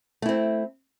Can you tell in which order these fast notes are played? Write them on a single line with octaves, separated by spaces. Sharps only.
A3 E4 C4